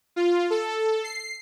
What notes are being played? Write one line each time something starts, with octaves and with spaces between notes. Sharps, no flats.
F4
A4
C7